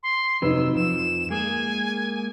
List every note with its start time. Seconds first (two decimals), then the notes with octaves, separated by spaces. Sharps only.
0.03 C6
0.42 F2 C3 F#3 D#4 B4 E6
0.76 F2 F3 E7
1.30 G#3 A#3 G#4 G#5